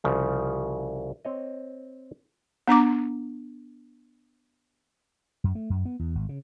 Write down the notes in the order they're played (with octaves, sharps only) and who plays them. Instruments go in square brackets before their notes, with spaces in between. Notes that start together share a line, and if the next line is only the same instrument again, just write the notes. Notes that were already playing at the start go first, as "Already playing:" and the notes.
[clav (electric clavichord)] C2 C#3 F3
C4 C#5 D#5
[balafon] B3 D4 A#5 D6
[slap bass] F#2
A3
F#2
B3
E2
G#1
C#3